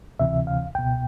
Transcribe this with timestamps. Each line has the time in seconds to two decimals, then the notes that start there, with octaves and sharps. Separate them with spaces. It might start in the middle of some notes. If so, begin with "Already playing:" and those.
0.19 D2 C3 E3 E5
0.47 F5
0.75 C#2 B2 G5